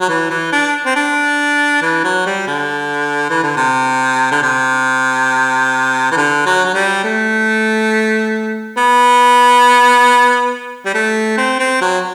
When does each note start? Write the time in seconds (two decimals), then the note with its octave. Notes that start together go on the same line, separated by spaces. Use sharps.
0.01 F#3
0.09 E3
0.30 E3
0.52 D4
0.86 C4
0.96 D4
1.82 E3
2.04 F#3
2.26 G3
2.48 D3
3.30 E3
3.43 D3
3.57 C3
4.32 D3
4.43 C3
6.12 E3
6.17 D3
6.46 F#3
6.65 F#3
6.74 G3
7.04 A3
8.77 B3
10.86 G3
10.95 A3
11.37 C4
11.60 C4
11.82 F#3